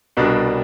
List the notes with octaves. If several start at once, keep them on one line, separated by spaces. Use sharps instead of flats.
C2 B2 G3 D4